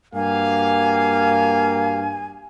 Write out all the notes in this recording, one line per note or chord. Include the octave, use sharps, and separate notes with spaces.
G2 A#3 F#4 G4 F5 G#5